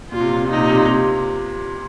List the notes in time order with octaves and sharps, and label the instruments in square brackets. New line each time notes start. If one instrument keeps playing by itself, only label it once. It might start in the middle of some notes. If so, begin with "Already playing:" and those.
[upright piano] A#2 [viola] F4
[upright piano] C3
A#2
C3
A#2
[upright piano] C3 [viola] D#4
[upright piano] A#2
C3
A#2
C3
A#2